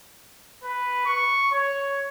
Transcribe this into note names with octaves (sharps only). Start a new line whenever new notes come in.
B4
C#6
C#5